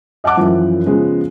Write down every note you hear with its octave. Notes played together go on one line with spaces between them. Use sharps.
D#5 F#5 A5 D6 F#6
F#2 E3 F3
C#3 F3 G#3 B3